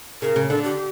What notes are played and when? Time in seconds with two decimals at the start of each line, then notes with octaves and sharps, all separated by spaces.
0.22 C#3 A#4
0.36 C#3
0.50 D3 A4
0.64 G4